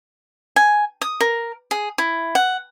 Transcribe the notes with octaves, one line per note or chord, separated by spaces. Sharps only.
G#5
D#6
A#4
G#4
E4
F#5